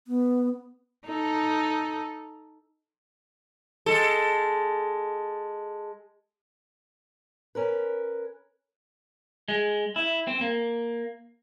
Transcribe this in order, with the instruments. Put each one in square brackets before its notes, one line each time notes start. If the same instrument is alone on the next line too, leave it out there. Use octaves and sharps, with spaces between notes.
[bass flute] B3
[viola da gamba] D#4 A4
[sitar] G#3 A4
[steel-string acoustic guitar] C#4 A#4 B4
[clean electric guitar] G#3
E4
C4
A#3